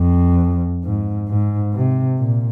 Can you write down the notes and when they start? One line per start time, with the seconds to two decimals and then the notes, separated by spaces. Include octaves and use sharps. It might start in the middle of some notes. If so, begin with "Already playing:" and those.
Already playing: F2
0.84 G#2
1.28 G#2
1.73 C3
2.19 A#2